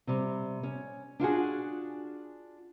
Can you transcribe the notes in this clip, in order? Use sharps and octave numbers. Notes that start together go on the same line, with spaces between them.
C3 G3
C#4
D4 F4 F#4 G#4